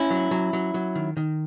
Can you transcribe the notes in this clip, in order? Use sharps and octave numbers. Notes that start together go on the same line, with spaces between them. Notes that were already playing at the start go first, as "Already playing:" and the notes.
Already playing: C#4 E4
F#3
F#3
F#3
F#3
D#3
D#3